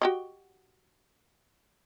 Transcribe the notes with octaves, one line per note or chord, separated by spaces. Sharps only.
F#4 G4 D#5